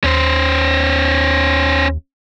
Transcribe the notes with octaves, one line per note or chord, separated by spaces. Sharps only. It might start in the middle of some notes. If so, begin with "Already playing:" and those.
D#2 C#4 C5